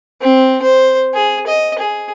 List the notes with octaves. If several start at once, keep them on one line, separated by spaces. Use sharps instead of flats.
C4
C5
G#4
D#5
G#4